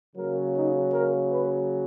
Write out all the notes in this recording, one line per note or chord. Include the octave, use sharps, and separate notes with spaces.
C#3 F#3 A#3 A#4
D#4
A#4
B4